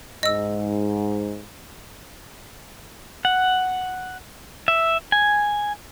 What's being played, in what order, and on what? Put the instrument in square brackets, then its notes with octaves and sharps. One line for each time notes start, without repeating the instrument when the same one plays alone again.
[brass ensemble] G#2 [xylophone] D#5 E6
[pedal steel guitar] F#5
E5
G#5